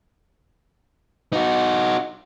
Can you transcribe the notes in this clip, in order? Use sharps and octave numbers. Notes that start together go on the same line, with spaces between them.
D#4 F#4